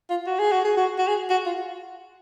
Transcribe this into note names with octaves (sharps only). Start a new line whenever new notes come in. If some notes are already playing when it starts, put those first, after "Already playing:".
F4
F#4
G#4
F#4
G#4
F#4
F#4
G#4
F#4
F4